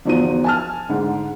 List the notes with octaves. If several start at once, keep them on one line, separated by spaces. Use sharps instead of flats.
G1 E2 F3 D#4 F#4 D#7
G#5 A5 F6
G#2 D3